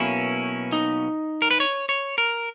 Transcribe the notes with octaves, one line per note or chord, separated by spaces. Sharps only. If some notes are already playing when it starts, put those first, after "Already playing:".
Already playing: B1 B2 A#3 C#4 E4
D#4
A#4
B4
C#5
C#5
A#4